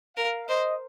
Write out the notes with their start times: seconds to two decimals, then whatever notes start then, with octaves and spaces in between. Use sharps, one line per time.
0.17 A#4 F5
0.48 C5 D#5